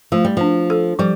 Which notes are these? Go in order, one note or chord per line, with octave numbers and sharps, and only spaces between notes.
F3 A3
G3
F3 D4
A4
F3 G3